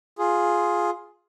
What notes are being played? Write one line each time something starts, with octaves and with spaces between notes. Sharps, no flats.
F4 G#4